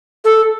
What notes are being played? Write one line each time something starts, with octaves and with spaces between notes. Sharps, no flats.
A4